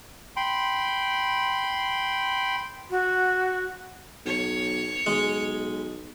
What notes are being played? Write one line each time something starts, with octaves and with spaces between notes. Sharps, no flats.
G5 B5 C6
F#4
B1 C#5
B1 G#3